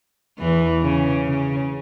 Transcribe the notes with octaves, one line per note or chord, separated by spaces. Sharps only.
E2 E3
C#3
C#3